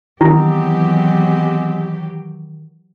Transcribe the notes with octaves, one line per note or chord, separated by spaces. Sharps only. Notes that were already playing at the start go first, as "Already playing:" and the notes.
D#3 E3 F#3 G#3 B3 C4 E4 G4